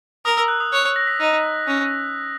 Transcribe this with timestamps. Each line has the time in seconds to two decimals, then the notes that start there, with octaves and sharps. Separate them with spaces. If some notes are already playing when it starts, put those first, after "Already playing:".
0.25 A#4 D#6
0.37 E6
0.48 F#6
0.60 D#6
0.72 C#5 F#6
0.85 F#6
0.96 A#6
1.07 B6
1.20 D#4 A#6
1.67 C#4